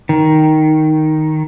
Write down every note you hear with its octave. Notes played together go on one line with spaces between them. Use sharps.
D#3